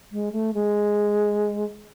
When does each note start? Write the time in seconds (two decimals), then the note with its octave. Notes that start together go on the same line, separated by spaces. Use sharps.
0.12 G#3
0.32 A3
0.54 G#3